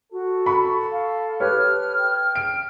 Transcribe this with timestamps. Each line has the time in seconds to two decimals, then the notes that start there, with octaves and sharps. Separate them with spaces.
0.12 F#4 A4
0.46 B5 C#6
0.92 F5
1.40 G4 B4 C#5 F6
1.98 G5
2.35 D7